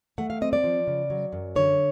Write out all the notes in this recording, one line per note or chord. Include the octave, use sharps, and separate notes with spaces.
A3 F#5
F5
C4 D#5
D5
F3
C#3
F#3
F#2
D3 C#5